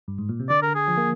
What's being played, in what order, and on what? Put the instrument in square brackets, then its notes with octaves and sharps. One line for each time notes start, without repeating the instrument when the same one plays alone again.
[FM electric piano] G2
G#2
A#2
C3
[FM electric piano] D3 [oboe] D5
[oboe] A#4
G#4
[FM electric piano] F3
A#3